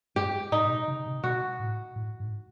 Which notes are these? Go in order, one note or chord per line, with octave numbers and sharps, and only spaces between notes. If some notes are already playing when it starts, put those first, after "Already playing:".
G2 G4
A2 D#4
A#2
B2
C#3
C3
B2 F#4
A2
A2
G#2